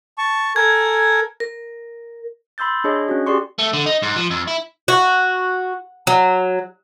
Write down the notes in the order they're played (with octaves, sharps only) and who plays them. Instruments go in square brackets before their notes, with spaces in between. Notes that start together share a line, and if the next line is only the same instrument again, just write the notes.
[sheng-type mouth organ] A5 C#6
[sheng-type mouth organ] A4 A#4 G#5 [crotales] G#6
[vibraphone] A#4
[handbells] B5 C6 E6 G6 A6
D4 G#4 C#5 D#5
C#4 F#4
G4 G#4 D5 C6 C#6
[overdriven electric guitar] A3
D3
D#4
G#2
F3
F2
E4
[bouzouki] F#4
F#3